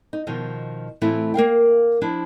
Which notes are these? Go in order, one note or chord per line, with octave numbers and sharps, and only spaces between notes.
D#4
B2 D#3 F3
A2 E3 A3 C4 E4 F4
A#3 A#4 F5 G5
F3 D4 E4